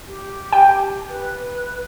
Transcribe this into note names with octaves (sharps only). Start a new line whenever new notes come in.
G4
G5
B4